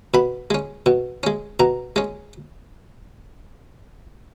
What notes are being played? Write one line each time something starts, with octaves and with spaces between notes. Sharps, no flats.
B2 B5
G#3 C#4
B2
G#3 C#4
B2 A#5
G#3 C#4